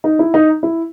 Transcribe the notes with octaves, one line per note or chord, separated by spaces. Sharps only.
D#4
E4
D#4
E4